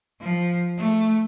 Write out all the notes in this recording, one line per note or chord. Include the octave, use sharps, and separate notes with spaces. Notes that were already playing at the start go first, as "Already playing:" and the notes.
F3
A3